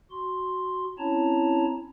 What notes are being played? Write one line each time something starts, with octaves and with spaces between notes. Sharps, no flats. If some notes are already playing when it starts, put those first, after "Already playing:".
F#4 C6
C4 C#4 E4 C#5 A5 A#5